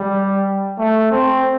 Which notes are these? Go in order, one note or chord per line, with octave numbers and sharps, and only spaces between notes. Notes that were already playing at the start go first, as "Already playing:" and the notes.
Already playing: G3
A3
C4